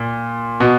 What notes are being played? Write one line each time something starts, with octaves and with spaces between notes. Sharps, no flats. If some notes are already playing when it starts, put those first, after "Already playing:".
Already playing: A#2
B2